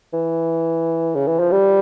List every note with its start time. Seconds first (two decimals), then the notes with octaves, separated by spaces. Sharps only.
0.13 E3
1.15 C#3
1.27 E3
1.40 F3
1.52 G3